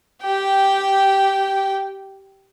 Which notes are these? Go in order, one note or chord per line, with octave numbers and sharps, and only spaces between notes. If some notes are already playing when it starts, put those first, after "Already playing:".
G4 G5